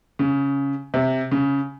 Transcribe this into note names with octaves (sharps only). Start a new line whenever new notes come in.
C#3
C3
C#3